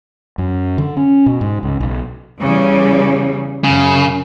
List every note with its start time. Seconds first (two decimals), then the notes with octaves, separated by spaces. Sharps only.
0.38 F#2
0.78 D3
0.97 C#4
1.26 B2
1.41 G#2
1.63 C#2
1.81 B1
2.39 E2 C#3 G3
3.64 F#2 C#3